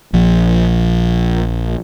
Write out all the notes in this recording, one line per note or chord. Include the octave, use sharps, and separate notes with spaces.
A#1 F3